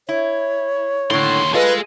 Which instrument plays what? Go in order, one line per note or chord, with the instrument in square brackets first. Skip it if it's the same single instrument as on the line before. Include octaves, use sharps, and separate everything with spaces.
[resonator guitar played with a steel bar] E4 [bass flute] C#5
[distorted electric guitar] D#2 C6 [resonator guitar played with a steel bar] A2 D3
[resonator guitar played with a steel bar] F4 A4 [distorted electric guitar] G#4 D#5 [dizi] B4